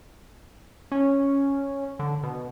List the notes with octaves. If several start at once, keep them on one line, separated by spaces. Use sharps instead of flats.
C#4
D3
B2